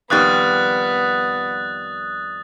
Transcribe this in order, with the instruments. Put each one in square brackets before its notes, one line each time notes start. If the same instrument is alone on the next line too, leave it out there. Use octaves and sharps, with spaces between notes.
[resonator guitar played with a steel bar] F2 D#3 G3 [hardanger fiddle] B3 [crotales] D#6 F#6 A6